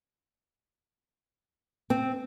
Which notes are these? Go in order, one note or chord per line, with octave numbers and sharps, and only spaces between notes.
C4